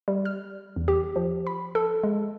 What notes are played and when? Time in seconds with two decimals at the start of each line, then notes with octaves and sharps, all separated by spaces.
0.08 G3
0.25 F6
0.76 E2
0.88 G4
1.16 F3
1.47 B5
1.75 A4
2.03 G#3